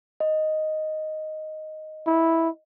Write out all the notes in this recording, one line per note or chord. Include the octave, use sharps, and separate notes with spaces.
D#5
E4